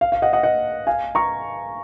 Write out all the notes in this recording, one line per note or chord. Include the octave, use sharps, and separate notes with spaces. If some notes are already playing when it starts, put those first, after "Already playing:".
F5
F5
D#5 F#5
D#5 F#5
D#5 F#5
F5 G#5
A#5 C#6